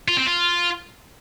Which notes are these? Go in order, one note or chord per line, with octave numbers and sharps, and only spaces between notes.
F4
C4
F4